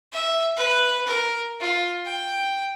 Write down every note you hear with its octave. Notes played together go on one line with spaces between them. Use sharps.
E5
B4
A#4
F4
G5